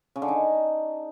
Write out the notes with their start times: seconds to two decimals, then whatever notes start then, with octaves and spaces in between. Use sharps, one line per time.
0.16 C#3
0.22 D3
0.28 D#4